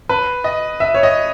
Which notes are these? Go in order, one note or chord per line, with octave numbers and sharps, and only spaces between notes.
B4
D#5
E5
C#5
D#5